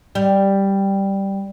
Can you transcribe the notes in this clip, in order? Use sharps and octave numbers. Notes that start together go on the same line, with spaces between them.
G3